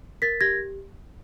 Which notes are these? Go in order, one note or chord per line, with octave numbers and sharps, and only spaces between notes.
A#4 A6 B6
G4 G#6 A#6